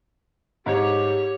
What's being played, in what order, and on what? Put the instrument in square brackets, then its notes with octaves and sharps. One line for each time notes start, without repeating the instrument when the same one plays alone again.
[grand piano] G#2 [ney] G4 [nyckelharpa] C#5